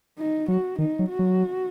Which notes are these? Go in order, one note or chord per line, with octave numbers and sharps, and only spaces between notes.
D#4
F#3 F#4
D#3 D#4
F#3
F#4
F#3